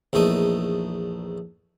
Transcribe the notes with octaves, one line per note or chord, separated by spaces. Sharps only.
A#1 E2 A3 D#4 D#6